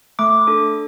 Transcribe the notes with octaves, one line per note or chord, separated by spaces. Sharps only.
A3 D6
D4 A4